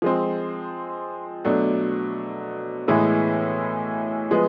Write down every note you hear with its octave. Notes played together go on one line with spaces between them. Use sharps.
F3 G#3 C4
B2 F#3 A3 D4
A2 E3 G#3 B3 E4
F3 G#3 B3